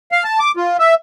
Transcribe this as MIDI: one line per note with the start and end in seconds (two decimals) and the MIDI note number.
0.12 0.24 77
0.24 0.39 81
0.39 0.52 86
0.57 0.77 65
0.79 0.94 76